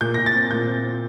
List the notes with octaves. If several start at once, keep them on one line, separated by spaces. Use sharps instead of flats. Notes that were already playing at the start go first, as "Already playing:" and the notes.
A#2 G6
A#2 A#6
A6
C4
A#2 G6
C4
C4